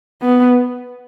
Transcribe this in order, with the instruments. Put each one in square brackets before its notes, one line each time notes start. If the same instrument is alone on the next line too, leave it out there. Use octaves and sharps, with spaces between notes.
[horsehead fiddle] B3